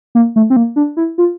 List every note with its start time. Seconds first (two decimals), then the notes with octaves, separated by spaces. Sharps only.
0.15 A#3
0.36 A3
0.50 C4
0.56 A#3
0.76 D4
0.97 E4
1.18 F4